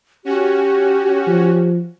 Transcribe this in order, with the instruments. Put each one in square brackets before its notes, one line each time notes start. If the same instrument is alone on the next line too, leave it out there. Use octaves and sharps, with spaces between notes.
[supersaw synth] C#4 F#4 [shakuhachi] G4
[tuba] F3